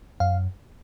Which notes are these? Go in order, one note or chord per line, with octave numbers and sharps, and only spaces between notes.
F#2 F5